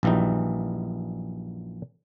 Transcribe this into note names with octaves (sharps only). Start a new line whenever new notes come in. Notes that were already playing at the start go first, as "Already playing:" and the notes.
A#1 F#2 E3 G3 D#4